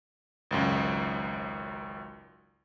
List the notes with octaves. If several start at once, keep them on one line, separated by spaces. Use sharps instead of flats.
G#1 C#2 F#2